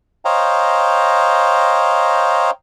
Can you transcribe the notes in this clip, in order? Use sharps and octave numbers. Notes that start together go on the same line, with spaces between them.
C5 C#5 D#5 F5 G5 A#5